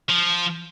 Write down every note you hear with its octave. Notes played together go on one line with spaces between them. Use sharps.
F3